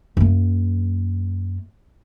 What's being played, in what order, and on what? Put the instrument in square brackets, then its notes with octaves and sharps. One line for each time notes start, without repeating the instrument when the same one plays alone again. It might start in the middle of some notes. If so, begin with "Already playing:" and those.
[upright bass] F#2 A#3